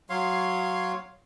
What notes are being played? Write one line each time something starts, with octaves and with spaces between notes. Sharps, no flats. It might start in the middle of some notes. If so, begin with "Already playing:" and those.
F#3 C#5 F5 C6